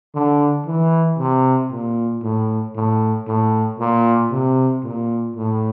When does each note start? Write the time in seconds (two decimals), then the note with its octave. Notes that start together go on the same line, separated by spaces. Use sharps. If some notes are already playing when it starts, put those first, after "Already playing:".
0.15 D3
0.67 E3
1.19 C3
1.71 A#2
2.23 A2
2.76 A2
3.28 A2
3.79 A#2
4.32 C3
4.84 A#2
5.36 A2